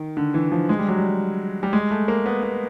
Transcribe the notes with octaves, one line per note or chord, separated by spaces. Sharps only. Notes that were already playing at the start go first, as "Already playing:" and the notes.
Already playing: D#3
D3
E3
F3
G#3
G3
F#3
G3
G3
G#3
A3
A#3
B3
B3